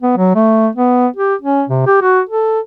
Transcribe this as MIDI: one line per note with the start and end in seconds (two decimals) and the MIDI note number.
0.02 0.14 59
0.17 0.30 54
0.35 0.69 57
0.76 1.07 59
1.16 1.35 67
1.42 1.64 61
1.69 1.82 48
1.86 2.00 67
2.02 2.21 66
2.29 2.60 69